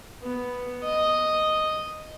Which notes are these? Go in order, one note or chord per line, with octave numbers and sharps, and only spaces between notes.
B3
D#5